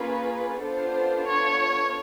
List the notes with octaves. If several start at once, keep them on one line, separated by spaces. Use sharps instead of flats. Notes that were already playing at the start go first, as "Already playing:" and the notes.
Already playing: A#3 C#4 F4 G#4 B4
B3 D4 F4 A4 C5
C#5